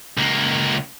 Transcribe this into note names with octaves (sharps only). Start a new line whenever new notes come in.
C#2 A#3